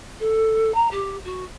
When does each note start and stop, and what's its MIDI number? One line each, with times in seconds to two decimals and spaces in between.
0.20 0.72 69
0.74 0.88 82
0.91 1.17 67
1.25 1.44 66